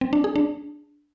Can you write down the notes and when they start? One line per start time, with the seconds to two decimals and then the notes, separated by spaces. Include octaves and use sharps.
0.01 C4
0.13 D4
0.24 G#4
0.36 D4